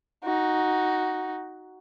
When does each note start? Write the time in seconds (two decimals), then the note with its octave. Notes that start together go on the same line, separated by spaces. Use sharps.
0.25 D#4 F#4